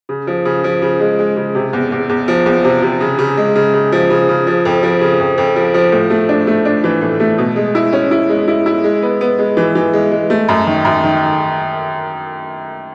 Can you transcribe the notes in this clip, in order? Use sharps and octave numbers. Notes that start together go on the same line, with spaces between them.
C#3
F3
C#3
F3
C#3
G#3
G#3
C#3
C3
E2
E2
E2
F3
E2
C3
C3
C#3
C#3
G#3
C#3
C#3
F3
C#3
C#3
F3
F2
F3
C#3
F2
F2
F3
F3
A2
A3
D4
A3
D4
E3
A2
A3
B2
G#3
E4
C#4
E4
G#3
E4
E4
G#3
B3
B3
G#3
E3
E3
G#3
G#3
A3
F#2
D#3
F#2
D#3